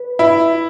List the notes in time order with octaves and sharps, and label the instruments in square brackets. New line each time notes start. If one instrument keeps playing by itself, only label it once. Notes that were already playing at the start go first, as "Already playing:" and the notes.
Already playing: [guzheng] B4
[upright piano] E4